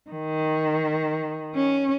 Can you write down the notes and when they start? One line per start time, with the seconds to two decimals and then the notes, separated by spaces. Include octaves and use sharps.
0.10 D#3
1.55 C#4